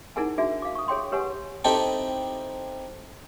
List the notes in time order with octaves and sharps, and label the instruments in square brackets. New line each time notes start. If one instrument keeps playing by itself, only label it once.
[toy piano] D#4 E4 G#4 A#4 F#5 G#5
D4 D#4 F#4 G#4 E5
F5 D6
C#6 D#6
G#4 C#5 G5 C6
G4 B4 C#5 F#5 G#5
[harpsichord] C4 D#4 E4 G4 A4